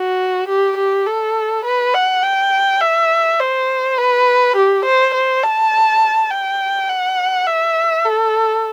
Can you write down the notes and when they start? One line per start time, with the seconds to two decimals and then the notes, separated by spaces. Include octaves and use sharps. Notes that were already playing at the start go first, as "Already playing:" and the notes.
Already playing: F#4
0.48 G4
0.77 G4
1.07 A4
1.65 B4
1.94 F#5
2.23 G5
2.81 E5
3.40 C5
3.98 B4
4.56 G4
4.85 C5
5.14 C5
5.43 A5
6.31 G5
6.89 F#5
7.47 E5
8.05 A4